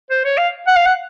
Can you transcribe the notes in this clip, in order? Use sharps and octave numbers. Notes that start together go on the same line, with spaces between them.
C5
C#5
F5
F#5
F5
F#5